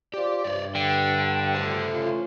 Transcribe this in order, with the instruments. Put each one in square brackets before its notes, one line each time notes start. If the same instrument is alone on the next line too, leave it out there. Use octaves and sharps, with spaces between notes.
[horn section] F4 C5 D5 [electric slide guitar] G4
[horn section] G2 [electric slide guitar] C#5 D5
[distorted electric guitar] D3 [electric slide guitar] G5
[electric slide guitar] A3 A4 C5
[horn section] E3 C#4 F4